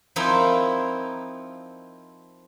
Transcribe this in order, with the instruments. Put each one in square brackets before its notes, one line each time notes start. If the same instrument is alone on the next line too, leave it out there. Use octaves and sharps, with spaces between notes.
[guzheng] F3 C4 D#4 E4 A#4